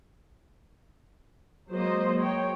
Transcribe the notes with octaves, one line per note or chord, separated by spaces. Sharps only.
F#3 G#3 A#3 C5 D#5
C#5 G5